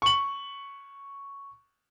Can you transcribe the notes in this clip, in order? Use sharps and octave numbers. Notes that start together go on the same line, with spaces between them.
C#6 F#7